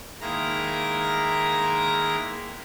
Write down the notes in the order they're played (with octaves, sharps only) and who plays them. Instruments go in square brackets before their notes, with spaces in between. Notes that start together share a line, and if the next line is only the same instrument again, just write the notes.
[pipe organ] D#3 G#3 A#3 E4 A#5 A#6